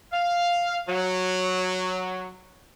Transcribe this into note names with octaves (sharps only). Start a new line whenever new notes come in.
F5
F#3